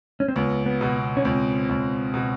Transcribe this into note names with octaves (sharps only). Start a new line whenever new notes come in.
C#4
C4
C#2 B3
B3
B2
C#4
C#2 C4
C#2
B2